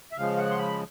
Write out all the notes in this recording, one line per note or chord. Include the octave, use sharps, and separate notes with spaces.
E5
C#3 F3 G#3 F5
F#5
C6
B5